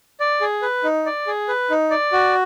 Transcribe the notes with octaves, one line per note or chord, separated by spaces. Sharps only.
D5
G#4
B4
D#4
D5
G#4
B4
D#4
D5
F#4